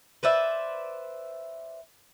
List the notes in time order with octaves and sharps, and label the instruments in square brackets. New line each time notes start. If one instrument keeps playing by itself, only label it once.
[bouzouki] B4 C5 D5 E5